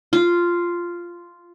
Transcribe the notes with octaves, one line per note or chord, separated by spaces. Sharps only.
F4